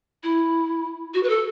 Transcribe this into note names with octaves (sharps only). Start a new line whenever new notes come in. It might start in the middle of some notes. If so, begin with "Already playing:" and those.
E4
F#4
B4
A4